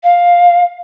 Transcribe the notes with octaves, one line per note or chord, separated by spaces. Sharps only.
F5